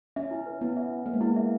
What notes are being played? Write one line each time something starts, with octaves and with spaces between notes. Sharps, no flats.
C#4 E5
E4
B4
B3 E4
E5
E4
A#3 B4
G#3
A#3 E4
E5